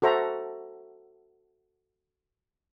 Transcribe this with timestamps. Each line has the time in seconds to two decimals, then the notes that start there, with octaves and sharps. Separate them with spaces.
0.02 F#4 A4 C5 E5 A#5